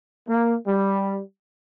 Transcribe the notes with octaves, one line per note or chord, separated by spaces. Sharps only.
A#3
G3